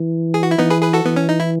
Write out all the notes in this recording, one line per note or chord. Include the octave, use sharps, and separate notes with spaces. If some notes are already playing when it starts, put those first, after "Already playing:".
Already playing: E3
G#4
F#4
E4
E3 B3 D#4
G#4 B4
G#4 B4
F#4 A4
E3 B3
C#4
D#4
E4